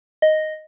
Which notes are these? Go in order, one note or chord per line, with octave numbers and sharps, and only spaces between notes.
D#5